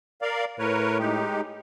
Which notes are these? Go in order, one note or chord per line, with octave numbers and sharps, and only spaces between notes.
A#4 D5 F5
A2 A#4 B4 C#5
G#3 D#4 G4